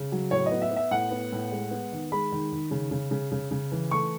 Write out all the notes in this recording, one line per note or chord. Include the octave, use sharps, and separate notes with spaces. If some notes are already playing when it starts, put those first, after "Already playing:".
Already playing: C#3
F#3
A2 C#5
D#5
B3
E5
B3
E5
A2 F#5
B3
A2
G#3
B3
D#3
G#3 B5
D#3
D#3
C#3
C#3
C#3
C#3
C#3
E3
A3 C#6